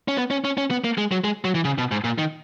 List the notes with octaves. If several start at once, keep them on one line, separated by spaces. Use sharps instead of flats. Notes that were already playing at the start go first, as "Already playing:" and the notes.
C#4
B3
C#4
C#4
C#4
B3
A#3
G#3
F#3
G#3
F#3
E3
C#3
B2
G#2
A#2
D#3